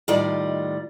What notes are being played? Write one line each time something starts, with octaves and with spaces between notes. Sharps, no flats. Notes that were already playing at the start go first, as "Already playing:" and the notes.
A2 D#3 G3 F4 D5 D#5